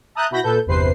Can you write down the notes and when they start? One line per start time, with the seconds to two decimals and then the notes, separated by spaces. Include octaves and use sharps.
0.15 E5 A5 A#5 D#6 F#6 G6
0.30 B2 E4 F#4 B5 G6 A#6
0.43 A#2 A4 B4 G6
0.66 G1 E2 C3 B4 C5 C7